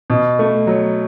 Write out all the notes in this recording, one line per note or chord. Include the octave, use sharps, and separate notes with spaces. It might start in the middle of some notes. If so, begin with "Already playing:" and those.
B2
A3
F#3